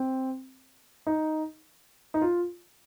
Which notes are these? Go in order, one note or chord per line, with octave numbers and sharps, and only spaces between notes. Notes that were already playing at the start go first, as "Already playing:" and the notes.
Already playing: C4
D#4
D#4
F4